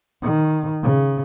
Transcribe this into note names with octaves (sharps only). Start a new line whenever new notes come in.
D#3
C#3